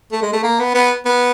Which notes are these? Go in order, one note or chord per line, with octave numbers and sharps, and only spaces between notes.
A3
G#3
A3
A#3
B3
B3
B3